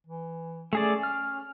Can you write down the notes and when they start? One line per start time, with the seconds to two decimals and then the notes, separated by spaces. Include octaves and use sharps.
0.07 E3
0.73 A3 C#4 G#4 D5
1.03 F6